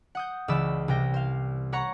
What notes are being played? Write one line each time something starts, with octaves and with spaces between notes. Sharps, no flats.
F#5 D#6 G6
C#2 C#3 E3 D5 B5 E6
C2 C3 G5 A#6
C5 F5
B4 C#5 F#5 A#5 C#6